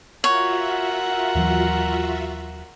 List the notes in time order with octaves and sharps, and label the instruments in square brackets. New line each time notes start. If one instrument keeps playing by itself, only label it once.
[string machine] F4 F#4 E5 [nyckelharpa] A#4 F#5 [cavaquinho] C#5
[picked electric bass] D#2 E3 F#3